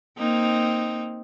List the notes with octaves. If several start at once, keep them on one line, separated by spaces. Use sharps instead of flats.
A#3 C4 D#4